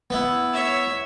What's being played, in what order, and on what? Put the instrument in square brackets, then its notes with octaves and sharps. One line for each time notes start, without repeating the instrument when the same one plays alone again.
[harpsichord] B3 E4
[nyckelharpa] C#5 E5